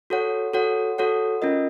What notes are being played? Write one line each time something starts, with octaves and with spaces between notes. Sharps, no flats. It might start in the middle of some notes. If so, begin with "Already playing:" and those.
F#4 A4 C#5 F#5
F#4 A4 C#5 F#5
F#4 A4 C#5 F#5
C#4 F4 A#4 D#5